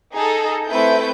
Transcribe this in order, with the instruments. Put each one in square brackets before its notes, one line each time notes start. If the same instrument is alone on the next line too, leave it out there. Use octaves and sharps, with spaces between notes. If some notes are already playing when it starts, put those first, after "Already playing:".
[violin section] D#4 G#4 A4
A3 C4 E4 B4 G6